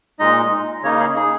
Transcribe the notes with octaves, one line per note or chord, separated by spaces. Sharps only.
A#2 G#3 D#4 D#5
C#3 A#3 D#4 C#5
G#4
G#4